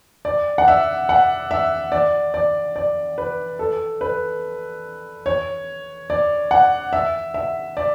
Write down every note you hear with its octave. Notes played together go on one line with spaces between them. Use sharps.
D5
F#5
E5
F#5
E5
D5
D5
D5
B4
A4
B4
C#5
D5
F#5
E5
E5
D5